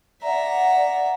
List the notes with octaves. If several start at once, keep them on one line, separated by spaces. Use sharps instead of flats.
D5 E5 F#5 A#5